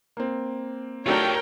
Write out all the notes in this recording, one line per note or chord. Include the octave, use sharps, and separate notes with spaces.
A#3 C4
F#3 A3 D4 F4 G4 A#4 C#5 G5